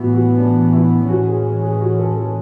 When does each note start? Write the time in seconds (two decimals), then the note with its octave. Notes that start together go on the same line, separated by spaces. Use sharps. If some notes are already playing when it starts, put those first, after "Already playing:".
Already playing: A2 E3 B3 E4 F#4
0.13 F#4
0.37 D4
0.73 E4
1.08 A2 E3 G#3 C#4 F#4
1.27 G#4
1.63 G#4
1.81 F#4
1.99 A4
2.16 A4